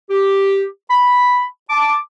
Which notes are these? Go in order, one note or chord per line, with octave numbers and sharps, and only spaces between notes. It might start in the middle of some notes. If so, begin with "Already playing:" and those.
G4
B5
A5 D6